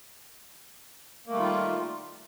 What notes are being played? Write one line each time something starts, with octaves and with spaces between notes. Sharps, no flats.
D#3 G3 A3 A#3 F4